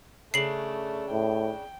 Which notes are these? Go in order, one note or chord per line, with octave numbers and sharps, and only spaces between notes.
C#3 A3 D4 C7 F#7
A2 G5